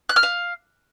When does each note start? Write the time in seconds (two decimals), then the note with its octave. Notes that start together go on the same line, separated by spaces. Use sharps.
0.09 F#6
0.16 F6
0.23 F5